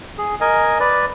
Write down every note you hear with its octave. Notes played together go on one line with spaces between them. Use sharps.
G#4
A#4 D#5 G#5
B4 D5